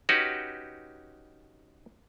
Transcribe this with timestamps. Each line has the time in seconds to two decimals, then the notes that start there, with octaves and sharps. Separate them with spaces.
0.09 C#4 D#4 F#4 G4 B4